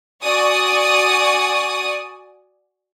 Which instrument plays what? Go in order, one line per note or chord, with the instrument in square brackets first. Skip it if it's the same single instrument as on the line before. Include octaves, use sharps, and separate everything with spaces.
[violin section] F#4 D5 G#5 C#6 D#6